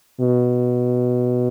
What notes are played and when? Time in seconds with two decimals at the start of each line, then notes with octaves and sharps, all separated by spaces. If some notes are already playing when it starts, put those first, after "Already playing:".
0.21 B2